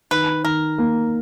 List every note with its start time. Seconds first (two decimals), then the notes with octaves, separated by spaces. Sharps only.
0.11 D#3 B4
0.44 D#3 A#4
0.78 A#3